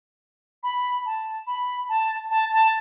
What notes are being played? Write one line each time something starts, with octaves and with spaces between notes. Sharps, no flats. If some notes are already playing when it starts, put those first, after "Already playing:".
B5
A5
B5
A5
A5
A5